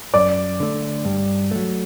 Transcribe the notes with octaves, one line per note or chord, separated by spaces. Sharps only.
F#2 D5 D6
D3 A3
G2
F#3 A3